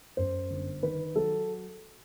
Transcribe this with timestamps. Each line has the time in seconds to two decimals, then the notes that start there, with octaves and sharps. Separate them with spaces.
0.17 F#2 C5
0.51 G1
0.83 D#3 B4
1.15 F#3 A4